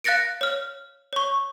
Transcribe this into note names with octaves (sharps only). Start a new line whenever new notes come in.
F5 F#6 A6 A#6 C#7 D7
C#5 F6
C#5 C#6